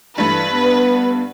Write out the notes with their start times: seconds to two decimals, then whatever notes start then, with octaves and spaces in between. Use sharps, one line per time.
0.18 G2 E3 A3 B4
0.53 B3